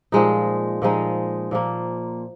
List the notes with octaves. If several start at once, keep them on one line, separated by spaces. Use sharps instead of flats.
A#2 F3 G#3 D#4
A#2 F3 G#3 D#4
A#2 F3 A#3